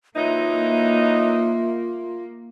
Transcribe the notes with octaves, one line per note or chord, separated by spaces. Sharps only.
E3 F#3 A#3 D#4 F4 E5